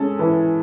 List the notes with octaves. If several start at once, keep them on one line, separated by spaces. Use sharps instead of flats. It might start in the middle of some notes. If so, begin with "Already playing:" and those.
Already playing: G#3 C#4 A4
E3